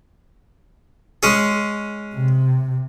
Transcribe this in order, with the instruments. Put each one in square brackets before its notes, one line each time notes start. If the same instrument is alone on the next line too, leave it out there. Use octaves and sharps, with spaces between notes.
[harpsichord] G#3 C#4 G#4
[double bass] C3